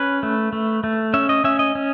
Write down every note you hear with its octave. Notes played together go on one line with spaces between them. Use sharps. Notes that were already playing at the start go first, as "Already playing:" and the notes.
Already playing: C#4 B4
A3
A3
A3
C#4 E5
D#5
C#4 E5
D#5
C#4